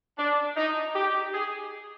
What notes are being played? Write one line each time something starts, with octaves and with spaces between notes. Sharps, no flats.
D4
D#4
G4
G#4